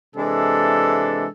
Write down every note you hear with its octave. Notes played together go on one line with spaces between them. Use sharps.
C3 E3 G#3 D4 A4